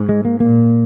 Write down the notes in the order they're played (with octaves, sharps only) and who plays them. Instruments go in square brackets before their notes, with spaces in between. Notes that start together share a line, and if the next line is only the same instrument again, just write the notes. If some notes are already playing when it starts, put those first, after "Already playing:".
Already playing: [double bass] G#2
[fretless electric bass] G#3
A#3
[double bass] A#2 [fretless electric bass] A#3